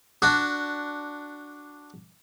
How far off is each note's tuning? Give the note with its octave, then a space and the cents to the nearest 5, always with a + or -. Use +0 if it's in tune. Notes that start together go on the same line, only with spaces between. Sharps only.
D4 +0 F#4 +0